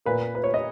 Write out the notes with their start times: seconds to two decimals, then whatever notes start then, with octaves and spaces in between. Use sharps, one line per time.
0.06 A#2 A#3 B4
0.35 B4
0.44 C#5
0.54 D#5